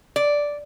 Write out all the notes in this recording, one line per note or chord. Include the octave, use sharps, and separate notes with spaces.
D5